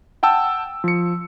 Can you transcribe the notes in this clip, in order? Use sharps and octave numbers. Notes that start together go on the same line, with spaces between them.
F#5 G5 A5 E6
F3 C#7